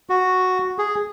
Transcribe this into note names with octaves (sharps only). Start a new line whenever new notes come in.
F#4
G#4